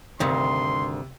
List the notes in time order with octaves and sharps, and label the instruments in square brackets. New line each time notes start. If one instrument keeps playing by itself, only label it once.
[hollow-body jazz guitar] D2 G2 D#3 [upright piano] C3 [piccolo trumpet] C6